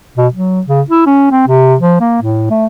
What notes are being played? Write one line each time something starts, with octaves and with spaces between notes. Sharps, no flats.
B2
F#3
C#3
E4
C#4
C4
C3
F3
A#3
A2
A3